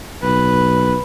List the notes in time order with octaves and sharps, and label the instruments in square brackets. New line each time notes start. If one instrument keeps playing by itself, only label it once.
[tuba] B1 [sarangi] B4